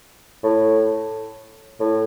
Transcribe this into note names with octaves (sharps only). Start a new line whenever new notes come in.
A2
A2